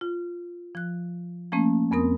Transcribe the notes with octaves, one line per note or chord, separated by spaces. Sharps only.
F4
F3 F#6
F3 A3 A#3 C#4
F2 B3 C4 A#4 D#6